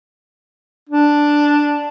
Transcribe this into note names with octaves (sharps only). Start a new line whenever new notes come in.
D4